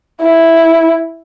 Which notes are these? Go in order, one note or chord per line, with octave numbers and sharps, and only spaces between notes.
E4